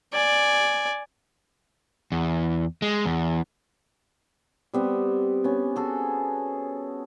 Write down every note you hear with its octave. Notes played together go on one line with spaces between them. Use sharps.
D5 G#5
E2
G#3
E2
G3 B3 C4
B3 C#4
F#4 G#4 A4